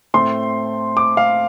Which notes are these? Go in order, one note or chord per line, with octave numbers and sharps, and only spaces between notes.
A2 A3 C4 C6
D6
F5